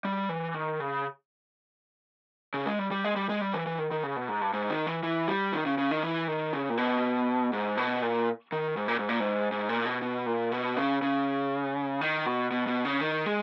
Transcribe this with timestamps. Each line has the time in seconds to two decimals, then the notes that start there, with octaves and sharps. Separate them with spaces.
0.05 G3
0.29 E3
0.54 D#3
0.80 C#3
2.54 C#3
2.66 G#3
2.79 G3
2.91 G3
3.04 G#3
3.16 G3
3.29 G#3
3.41 G3
3.54 E3
3.67 E3
3.78 D#3
3.91 D#3
4.04 C#3
4.16 B2
4.29 G#2
4.42 G2
4.53 G#2
4.70 D#3
4.87 E3
5.03 E3
5.28 G3
5.53 D#3
5.66 C#3
5.78 C#3
5.91 D#3
6.03 E3
6.28 D#3
6.53 C#3
6.69 A#2
6.78 B2
7.53 G#2
7.77 B2
8.02 A#2
8.52 D#3
8.77 G#2
8.88 A#2
8.99 G#2
9.09 A#2
9.20 G#2
9.52 G#2
9.69 A#2
9.86 B2
10.02 B2
10.26 A#2
10.52 B2
10.77 C#3
11.02 C#3
12.01 D#3
12.26 B2
12.51 B2
12.67 B2
12.85 C#3
13.01 D#3
13.26 G#3